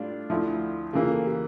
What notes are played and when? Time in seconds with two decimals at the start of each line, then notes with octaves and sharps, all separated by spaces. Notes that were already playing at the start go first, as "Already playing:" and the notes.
Already playing: A2 G3 D4 F4
0.30 D2 D3 F3 E4
0.93 C#3 E3 A#3 F4
1.09 A4
1.25 G4